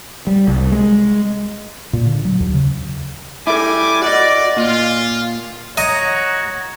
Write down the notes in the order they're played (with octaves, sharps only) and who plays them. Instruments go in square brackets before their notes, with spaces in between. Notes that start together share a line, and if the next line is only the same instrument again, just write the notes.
[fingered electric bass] G3
C2
G#3
A#2
D3
F#3
D#2
C#3
[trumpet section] G3 G#5 D6 [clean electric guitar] E4 A4
[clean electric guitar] F#4 D#5 [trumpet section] D5
[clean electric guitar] A#2 [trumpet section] F4
[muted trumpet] F#4 [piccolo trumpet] C#5 [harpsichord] D#5 [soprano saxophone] A#5